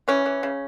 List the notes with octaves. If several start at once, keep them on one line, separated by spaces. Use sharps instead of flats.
E3 C#4
E3
C#3